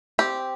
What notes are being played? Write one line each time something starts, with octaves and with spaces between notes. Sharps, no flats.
C4 G4